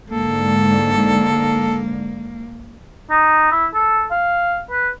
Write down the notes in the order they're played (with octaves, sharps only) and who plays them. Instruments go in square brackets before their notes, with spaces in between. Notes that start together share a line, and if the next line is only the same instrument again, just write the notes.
[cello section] G#2 D3 [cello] A#3 [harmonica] A4
[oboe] D#4
E4
A4
F5
B4